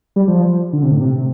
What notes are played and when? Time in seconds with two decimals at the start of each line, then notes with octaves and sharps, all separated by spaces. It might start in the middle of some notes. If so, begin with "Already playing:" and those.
0.16 G3
0.28 F3
0.73 D3
0.83 C3
0.91 A2
1.01 C3